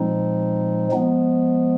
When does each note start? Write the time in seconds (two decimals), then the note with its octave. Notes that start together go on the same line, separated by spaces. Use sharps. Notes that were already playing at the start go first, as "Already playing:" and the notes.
Already playing: A#2 F3 G#3 C4 D#4
0.92 F3 G#3 B3